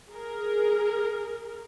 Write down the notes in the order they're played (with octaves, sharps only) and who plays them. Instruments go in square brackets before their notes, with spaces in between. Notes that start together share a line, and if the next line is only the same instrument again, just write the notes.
[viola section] G#4 A#4